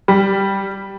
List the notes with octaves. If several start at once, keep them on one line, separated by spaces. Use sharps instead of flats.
G3